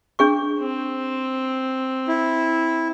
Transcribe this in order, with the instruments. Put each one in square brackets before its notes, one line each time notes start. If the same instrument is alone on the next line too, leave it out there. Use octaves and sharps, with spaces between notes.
[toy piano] D4 G#4 C#6
[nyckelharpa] C4
[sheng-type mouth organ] E4